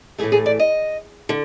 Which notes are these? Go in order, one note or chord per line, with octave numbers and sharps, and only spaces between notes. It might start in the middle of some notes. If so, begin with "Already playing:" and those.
A2 E3 A3 G#4
G#4
D5
D#5
D3